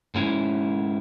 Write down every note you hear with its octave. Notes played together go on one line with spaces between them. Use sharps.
G#2 G#3 C#4 E4